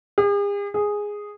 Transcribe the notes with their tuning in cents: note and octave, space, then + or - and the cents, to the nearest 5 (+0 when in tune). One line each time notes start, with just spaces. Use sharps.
G#4 -45
G#4 -5